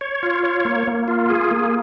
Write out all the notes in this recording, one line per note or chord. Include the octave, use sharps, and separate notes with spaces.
C#5
F4
C#5
A#3
A#3
F4
G#4
A#3